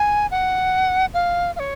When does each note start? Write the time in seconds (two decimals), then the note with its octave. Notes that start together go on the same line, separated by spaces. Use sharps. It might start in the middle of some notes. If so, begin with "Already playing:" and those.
Already playing: G#5
0.31 F#5
1.14 F5
1.56 F5
1.59 C#5